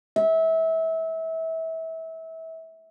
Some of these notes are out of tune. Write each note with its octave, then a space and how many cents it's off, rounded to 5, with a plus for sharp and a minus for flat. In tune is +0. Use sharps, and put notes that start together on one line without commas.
E5 -25